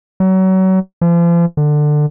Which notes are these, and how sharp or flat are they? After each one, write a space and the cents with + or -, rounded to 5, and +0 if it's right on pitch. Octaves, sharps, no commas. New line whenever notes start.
F#3 +30
F3 -40
D3 +20